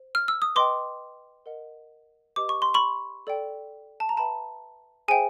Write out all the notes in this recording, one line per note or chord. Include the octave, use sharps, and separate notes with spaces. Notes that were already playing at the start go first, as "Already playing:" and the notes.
Already playing: C5
F6
E6
D#6
B4 D#5 G5 C6 D6
A#4 D#5 F#5
G4 B4 D#5 D6
C#6
C6
B5 C#6
A4 D5 G5
A5
A#5
B4 E5 G5 A5 B5
G#4 C5 E5 G5 G#5